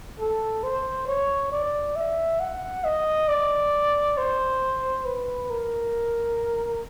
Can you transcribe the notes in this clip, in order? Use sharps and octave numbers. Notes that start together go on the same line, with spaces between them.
A4
C5
C#5
D5
E5
F#5
D#5
D5
C5
B4
A#4